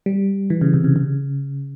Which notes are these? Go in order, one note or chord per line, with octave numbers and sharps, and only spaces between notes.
G3
E3
C#3
C3
C#3
C#3